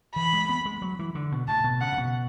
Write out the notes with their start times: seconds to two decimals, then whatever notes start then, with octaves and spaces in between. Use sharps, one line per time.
0.16 E3 B5
0.33 G#3
0.49 B3
0.65 G#3
0.82 F#3
0.99 E3
1.15 D3
1.32 B2
1.48 A2 A5
1.64 B2
1.80 C#3 F#5
1.92 A2
1.98 B2